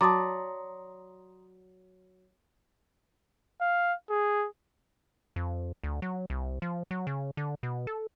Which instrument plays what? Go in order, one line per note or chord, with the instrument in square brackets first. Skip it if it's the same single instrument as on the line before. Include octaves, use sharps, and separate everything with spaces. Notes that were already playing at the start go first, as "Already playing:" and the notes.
[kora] F#3 D5 [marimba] A5 D6 [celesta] A#5 C6 D#6
[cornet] F5
G#4
[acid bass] F2
D2
F#3
C2
F3
F#3
C#3
D3
B2
A4